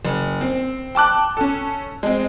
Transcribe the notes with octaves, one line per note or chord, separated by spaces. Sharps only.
F#1
C4
G5 A5 D6 F#6
C#4 A4
G#3 C4